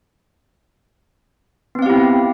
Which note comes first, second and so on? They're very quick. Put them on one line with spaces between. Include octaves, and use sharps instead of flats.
B3 C4 F5 G4 E4